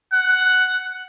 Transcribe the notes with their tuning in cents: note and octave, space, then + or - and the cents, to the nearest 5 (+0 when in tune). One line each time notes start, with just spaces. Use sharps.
F#5 +5